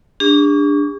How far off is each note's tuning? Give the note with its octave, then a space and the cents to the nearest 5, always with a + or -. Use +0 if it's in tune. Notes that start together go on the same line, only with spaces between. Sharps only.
D4 +0 G#4 -45 C#6 +25